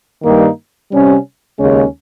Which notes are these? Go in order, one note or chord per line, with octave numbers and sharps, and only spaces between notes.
G2 D#3 G3 A#3 D#4
C3 G3 C#4
D#2 C#3 G#3 C#4